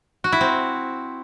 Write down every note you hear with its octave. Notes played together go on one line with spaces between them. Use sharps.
F#4
E4
C4